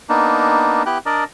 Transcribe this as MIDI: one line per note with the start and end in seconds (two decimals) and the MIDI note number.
0.09 0.83 58
0.09 0.83 59
0.09 0.83 62
0.09 0.83 63
0.86 0.98 59
0.86 0.98 64
0.86 0.98 67
0.86 0.98 79
0.86 0.98 90
1.06 1.24 62
1.06 1.24 70
1.06 1.24 74
1.06 1.24 75